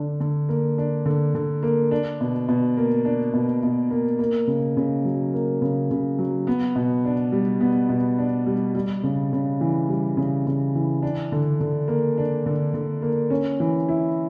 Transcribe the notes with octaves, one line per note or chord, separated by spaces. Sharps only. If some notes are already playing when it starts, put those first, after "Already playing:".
Already playing: D3 D4
D3
A#3
D4
D3
D3
A#3
D4
B2
B2
A#3
D4
B2
B2
A#3
A#3
C#3
C#3
F#3
A#3
C#3
C#3
F#3
B3
B2
D4
G3
B3
B2
D4
G3
G3
C#3
C#3
E3
G3
C#3
C#3
E3
D4
D3
D3
A#3
D4
D3
D3
A#3
C#4
E3
E4